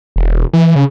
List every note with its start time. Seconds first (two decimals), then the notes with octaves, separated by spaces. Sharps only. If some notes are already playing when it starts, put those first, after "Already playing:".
0.16 E1
0.53 E3
0.76 C#3